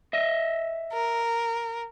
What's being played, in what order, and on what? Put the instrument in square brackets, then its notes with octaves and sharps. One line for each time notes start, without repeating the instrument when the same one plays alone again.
[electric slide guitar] D#5 E5
[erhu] A#4